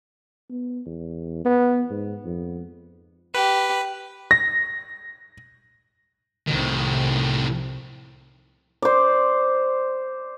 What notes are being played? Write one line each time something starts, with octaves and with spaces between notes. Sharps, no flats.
B3
E2
B3
G#2
F2
G4 B4
A#6
C2 A2 C3 D#3
C5 D5